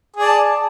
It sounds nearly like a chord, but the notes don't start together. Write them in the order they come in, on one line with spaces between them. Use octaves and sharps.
G#4 D5 A5